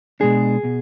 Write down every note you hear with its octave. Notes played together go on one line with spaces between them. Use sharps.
B2 G#3 D4 G#4
B2